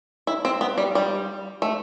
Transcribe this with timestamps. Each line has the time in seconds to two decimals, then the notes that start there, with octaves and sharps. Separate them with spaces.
0.27 E4
0.45 C4
0.61 B3
0.78 G3
0.95 G3
1.62 A3